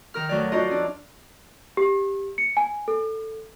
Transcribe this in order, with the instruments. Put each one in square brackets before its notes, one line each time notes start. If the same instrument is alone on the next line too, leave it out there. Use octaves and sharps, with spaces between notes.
[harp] D#3 A#4 F6
D2 F#3 D5
D4 D#4 F4 F#4 D5 D#5
F2 D4
[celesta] G4
C#7
G#5
A4